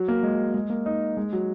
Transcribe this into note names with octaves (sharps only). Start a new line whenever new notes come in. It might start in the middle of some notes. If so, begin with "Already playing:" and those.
Already playing: F#3
A#3
G#3
G#3
A#3
D#4
G#3
F#3